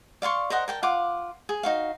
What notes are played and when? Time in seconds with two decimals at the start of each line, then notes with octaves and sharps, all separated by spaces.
0.22 D5 F5 C6 C#6
0.50 A#4 C5 D#5 F#5
0.68 A#4 G5 A5
0.83 F4 F5 F#5 D6
1.49 G#4
1.63 D#4 F#4 F5